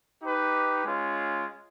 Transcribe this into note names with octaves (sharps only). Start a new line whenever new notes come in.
D#4 G4 B4
G#3 C#4 F4